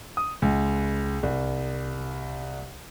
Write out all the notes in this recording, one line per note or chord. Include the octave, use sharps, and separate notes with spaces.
D#6
C#2
C2